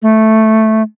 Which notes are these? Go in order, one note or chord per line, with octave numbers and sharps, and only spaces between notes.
A3